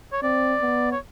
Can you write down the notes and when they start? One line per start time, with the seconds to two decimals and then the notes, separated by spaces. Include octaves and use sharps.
0.12 C#5
0.22 C4 D5
0.61 B3
0.92 C#5